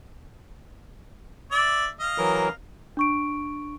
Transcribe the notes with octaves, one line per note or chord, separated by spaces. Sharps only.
D5 E5
D#5 F5
E3 F#3 A#4
D4 C#6 D7